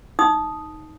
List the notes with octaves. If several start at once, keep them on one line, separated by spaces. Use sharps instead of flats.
D#4 D#6